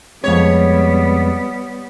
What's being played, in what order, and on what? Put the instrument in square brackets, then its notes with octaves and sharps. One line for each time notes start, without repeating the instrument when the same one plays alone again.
[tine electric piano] F2 G#3 C4 [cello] G3 B3 [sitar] C#5